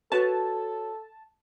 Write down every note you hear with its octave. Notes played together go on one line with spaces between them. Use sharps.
F#4 A4 B4 C#5 A5